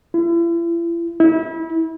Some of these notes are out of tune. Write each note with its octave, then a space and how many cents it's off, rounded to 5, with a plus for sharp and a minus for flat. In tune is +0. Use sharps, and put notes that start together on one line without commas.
E4 +40
E4 -30